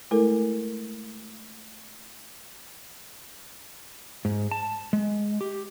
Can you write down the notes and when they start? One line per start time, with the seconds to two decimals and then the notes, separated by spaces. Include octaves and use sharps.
0.11 G#3 A3 E4 A4 A#4
4.25 G#2
4.51 A5
4.93 G#3
5.41 G4